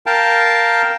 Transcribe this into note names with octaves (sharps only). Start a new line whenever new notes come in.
A#4 F5 G5 A5